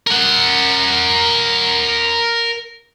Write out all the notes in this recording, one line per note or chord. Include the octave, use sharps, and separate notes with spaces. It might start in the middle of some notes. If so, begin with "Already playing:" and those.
A#4 F#5